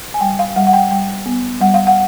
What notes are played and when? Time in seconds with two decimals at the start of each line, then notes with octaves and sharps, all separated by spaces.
0.14 G#5
0.21 G3 G5
0.39 F5
0.56 G3 F#5
0.67 F#5
0.73 G5
0.91 G3 G5
1.26 B3
1.60 G3 F#5
1.74 F5
1.87 F#5